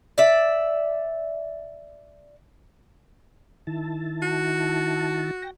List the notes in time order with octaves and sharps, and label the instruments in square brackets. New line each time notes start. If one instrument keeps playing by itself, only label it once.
[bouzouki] D5 E5
[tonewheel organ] D#3 E4 A5
[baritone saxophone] F#4
[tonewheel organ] G5 A#6